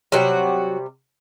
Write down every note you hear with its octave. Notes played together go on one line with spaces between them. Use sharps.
C3 D#3 F#3 G3 F#4